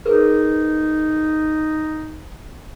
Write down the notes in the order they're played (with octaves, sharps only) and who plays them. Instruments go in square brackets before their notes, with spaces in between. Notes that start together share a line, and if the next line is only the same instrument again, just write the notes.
[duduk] D#4 [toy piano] G#4 A#4 B4